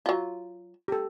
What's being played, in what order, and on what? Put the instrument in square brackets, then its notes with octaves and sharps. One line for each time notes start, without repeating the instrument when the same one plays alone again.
[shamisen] F#3 F4
[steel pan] G4 A4